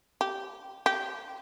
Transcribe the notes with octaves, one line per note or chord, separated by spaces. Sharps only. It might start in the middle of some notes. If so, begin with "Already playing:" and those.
G4
G4